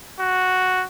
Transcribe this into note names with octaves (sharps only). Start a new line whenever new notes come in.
F#4